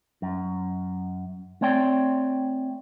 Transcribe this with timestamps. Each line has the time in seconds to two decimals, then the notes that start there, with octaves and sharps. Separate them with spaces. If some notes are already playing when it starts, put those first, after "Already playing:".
0.22 F#2
1.61 A3 C4 C#5 D5 G5